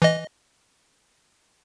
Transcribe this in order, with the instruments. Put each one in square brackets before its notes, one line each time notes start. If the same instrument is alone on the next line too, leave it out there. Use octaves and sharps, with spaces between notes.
[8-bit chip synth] E3 D#5